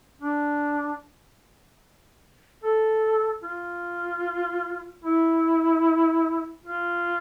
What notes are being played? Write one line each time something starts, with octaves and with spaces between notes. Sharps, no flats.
D4
A4
F4
E4
F4